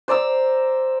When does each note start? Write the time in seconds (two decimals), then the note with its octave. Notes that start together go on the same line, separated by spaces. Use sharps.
0.08 C5 D5 A#5 E6